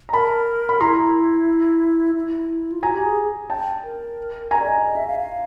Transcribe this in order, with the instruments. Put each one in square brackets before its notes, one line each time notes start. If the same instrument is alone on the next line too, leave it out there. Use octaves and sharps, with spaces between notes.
[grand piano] A#5
[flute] A#4 [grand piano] A5 B5
[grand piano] B5
[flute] E4 [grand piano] A#5 C6
[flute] E4
F4
[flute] F#4 [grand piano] G#5 A#5
[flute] G4
G#4
[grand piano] G5 A5
[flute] A#4
[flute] A#4 [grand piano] G#5 A#5
[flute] D5
D#5
D#5
E5
F5
F5